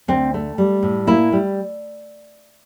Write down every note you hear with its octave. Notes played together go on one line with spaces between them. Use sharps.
D2 C4
A3
G3
A2
A#3 E4
G3